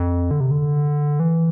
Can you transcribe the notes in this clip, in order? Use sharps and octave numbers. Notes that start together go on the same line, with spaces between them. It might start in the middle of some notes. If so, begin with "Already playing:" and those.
Already playing: F2
D3
C3
D3
E3